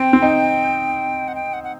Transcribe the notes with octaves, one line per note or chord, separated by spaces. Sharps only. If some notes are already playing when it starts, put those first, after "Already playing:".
Already playing: C4 G5
C4
D#4
F#5
G5
F#5
F#5